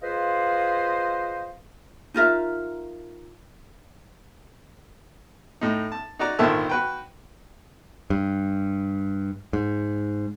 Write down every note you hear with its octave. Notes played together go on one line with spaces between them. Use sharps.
F4 G#4 B4 C5 D#5 F5
D#4 F4 A#4 E5
A2 D#4
A5
D#4 F#4 D5 A#5
G#1 A#2 D3 D#3 E5 A5
F#4 B4 G5
G2
G#2